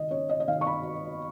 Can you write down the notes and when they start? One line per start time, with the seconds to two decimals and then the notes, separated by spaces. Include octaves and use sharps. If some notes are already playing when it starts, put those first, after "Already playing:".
Already playing: D#3 D#5
0.11 C#4 C#5
0.29 D#5
0.40 D#5
0.48 D#3 F5
0.61 C#6
0.67 B5